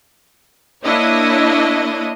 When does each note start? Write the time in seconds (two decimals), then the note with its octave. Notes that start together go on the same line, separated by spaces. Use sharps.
0.84 A#3 D4 E4 C#5 D#5